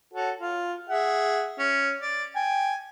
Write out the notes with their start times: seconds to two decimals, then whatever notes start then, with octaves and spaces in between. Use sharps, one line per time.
0.13 F#4 A4 C#5
0.41 F4
0.89 G#4 E5 F#5
1.59 C#4
2.01 D5
2.36 G5 G#5